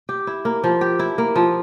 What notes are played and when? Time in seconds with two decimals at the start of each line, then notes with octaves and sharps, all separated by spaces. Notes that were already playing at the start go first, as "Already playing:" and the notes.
0.09 G4
0.27 E4
0.45 A#3
0.64 F3
0.81 G4
0.99 E4
1.18 A#3
1.36 F3